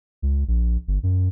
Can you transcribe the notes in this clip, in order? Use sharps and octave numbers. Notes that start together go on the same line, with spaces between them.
C#2
A#1
G1
F#2